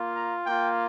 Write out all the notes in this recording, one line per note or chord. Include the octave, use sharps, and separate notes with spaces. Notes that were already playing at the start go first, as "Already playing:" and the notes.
Already playing: A#3 F4
A#5
A#3 F4 G5